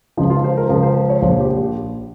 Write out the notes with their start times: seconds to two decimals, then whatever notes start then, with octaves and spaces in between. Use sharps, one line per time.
0.17 C#2 C#3 F3 D#4
0.30 F4
0.44 C5
0.57 A#4
0.69 C#2 C#3 F3 G#4
0.83 C5
0.95 C5
1.10 C#5
1.22 A#1 A#2 F3 C5
1.39 G4